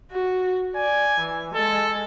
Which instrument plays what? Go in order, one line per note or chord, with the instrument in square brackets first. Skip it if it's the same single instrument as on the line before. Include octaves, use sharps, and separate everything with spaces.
[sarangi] F#4
[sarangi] D5 [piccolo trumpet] G#5
[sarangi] E3
[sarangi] G#3 [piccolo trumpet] A4